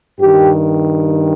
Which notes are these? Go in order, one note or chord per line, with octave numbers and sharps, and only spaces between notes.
G2 D#3 G4